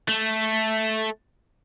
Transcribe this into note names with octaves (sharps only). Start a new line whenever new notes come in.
A3